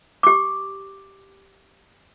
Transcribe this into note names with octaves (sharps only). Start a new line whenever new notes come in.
G4 D6